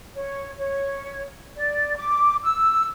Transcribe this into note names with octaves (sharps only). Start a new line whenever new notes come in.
C#5
C#5
D5
D6
E6